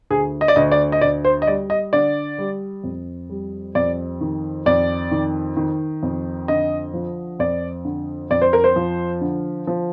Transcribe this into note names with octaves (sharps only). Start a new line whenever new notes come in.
D2 G#4
D#5
D5
D2 D#5
D5
D#5
D2 D5
C5
D#5
G3 D5
D#5
D3 D5
G3
F2
G3
F2 D5
D#3
F2 D5
D#3
D#3
F2
D3 D#5
F3
F2 D5
D3
F2 D5
C5
A#4
C5
F3
D3
F3